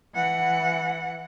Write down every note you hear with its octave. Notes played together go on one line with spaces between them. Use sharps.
E3 F#5